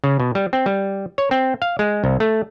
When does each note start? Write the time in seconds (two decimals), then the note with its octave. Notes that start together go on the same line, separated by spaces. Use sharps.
0.04 C#3
0.20 B2
0.35 G3
0.53 C4
0.66 G3
1.18 C#5
1.31 C4
1.62 F5
1.79 G#3
2.04 C2
2.20 A3